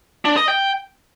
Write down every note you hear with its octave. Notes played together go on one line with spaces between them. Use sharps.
D4
D#5
G5